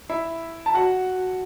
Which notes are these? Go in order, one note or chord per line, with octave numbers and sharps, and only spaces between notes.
E4 E5
A5
F#4 F#5